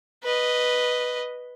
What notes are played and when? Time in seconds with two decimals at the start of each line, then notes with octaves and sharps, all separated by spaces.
0.23 B4 D#5